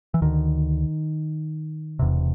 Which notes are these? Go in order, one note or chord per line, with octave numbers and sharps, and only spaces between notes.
E3
D2 D3 D#3
E1 E2 C3